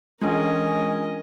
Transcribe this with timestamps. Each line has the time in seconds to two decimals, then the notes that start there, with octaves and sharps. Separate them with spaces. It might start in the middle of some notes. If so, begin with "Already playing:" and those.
0.21 E3 G#3 C#4 D4 F4 A#4 D#5